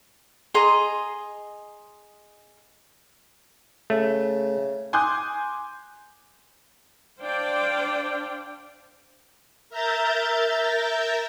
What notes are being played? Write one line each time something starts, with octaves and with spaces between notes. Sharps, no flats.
G#4 D#5 A#5 C6
C#3 A3
G#5 C6 D6 D#6 F#6 G6
D4 C5 D5 F5 G5
A#4 E5 A#5 G6 A6